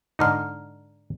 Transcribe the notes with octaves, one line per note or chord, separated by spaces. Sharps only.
G#2 D3 D#4 D5 A#5 F6